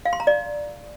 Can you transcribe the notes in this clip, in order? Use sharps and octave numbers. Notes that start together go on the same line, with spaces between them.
F5
C6
A#5
D5